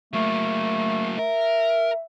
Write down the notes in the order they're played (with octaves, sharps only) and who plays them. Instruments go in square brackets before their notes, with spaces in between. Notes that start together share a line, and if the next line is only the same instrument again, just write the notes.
[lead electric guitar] F#3 A#3 [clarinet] A3
[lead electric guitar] A#4 [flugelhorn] E5